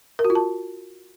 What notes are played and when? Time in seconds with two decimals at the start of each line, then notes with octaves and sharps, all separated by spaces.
0.19 A#4
0.25 F#4
0.30 F4
0.35 A5